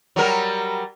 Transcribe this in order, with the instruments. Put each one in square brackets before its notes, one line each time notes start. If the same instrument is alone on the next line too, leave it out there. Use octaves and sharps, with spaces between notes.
[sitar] F#3 G3 A#4